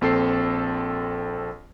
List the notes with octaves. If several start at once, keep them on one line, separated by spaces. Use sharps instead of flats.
A#1 C4 A4 C7